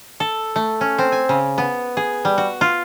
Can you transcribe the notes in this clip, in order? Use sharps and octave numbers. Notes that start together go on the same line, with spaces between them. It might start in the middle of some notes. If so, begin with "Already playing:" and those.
A4
A3
C#4
C4
G#5
C#3
B3
G#4
G3
F#4
F4